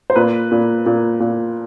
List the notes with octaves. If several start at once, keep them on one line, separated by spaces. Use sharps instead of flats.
C5
A#2 B4
A#2
A#2
A#2